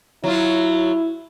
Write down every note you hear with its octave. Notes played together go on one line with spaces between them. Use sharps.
F#3 E4 F4